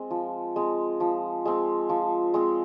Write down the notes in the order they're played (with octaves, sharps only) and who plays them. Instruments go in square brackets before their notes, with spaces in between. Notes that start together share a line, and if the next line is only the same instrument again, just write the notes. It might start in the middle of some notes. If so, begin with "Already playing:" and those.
Already playing: [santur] G#3 C4
F3
G#3 C4
F3
G#3 C4
F3
G#3 C4